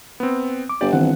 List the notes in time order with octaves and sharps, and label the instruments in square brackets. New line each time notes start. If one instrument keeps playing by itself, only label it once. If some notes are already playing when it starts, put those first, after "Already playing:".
[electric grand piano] B3 C4
[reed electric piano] D6
[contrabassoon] G1 [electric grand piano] G4 D5
[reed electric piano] D#3 E3 C4 [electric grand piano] F#5